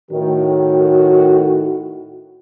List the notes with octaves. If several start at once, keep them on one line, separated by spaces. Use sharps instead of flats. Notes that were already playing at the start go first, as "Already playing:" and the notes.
A2 D#3 F#4